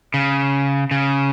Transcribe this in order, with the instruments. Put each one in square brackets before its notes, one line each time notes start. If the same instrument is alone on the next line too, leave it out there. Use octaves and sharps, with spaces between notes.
[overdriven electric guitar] C#3
C#3